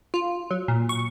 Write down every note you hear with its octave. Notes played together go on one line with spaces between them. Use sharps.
F4
F#3
A#2
C#6